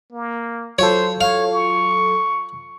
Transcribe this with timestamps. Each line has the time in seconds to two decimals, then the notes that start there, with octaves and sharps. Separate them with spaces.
0.12 A#3
0.79 F#3 F4 A4 C5 C#5
1.21 C#5 F5
1.51 C#6